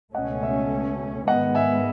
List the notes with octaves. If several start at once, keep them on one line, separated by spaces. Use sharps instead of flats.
C#2 B2 A3 C#4 D#5 F#5
C#5 E5
G#2 D#3 G#3 B3 D#5 F#5
E5 G#5